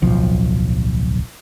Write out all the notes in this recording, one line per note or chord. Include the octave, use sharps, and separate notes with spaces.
D1 B1 F3